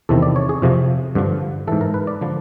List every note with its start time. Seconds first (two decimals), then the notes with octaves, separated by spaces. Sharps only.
0.09 E2 C3 D#3 A4
0.22 D5
0.36 C#5
0.49 G#4
0.62 F2 C3 F3
1.15 G2 D3 F3
1.67 G#2 E3 A4
1.81 A#4
1.94 B4
2.07 D5
2.21 D3 F3